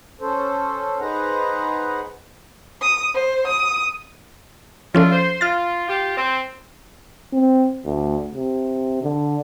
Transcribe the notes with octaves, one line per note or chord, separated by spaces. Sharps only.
C#4 A4 C5
D#4 G#4 B4 C5 F#5 A#5
D#6
C5
D#6
F3 C#4 D4 E4 F4 A4
C5
F4 F6 A6
F4 G4
C4
C4
D2
C3
D3